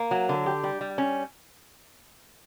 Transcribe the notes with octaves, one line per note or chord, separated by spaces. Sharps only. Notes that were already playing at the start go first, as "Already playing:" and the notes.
Already playing: A#3
F#3
D3
G4
G3
G3
C#4